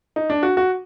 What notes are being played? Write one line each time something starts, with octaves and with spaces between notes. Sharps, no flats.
D#4
D4
F#4
F#4